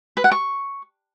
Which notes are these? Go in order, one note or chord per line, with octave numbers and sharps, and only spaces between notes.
B4
F#5
C#6